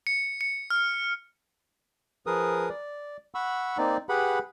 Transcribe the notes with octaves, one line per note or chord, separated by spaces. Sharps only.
C#7
C#7
F6
F3 G#4 A#4 B4 D#6
D5
F#5 B5 C#6 E6
A#3 C4 D#4 D5
G4 G#4 B4 F#5 B5